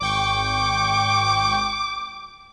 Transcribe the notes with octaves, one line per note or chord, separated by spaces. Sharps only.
G#1 G5 C#6 D6